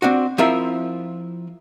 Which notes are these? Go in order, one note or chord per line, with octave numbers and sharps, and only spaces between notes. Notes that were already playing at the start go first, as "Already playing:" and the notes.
C4 D4 F#4
F3 C4 E4 F4 A#4 E5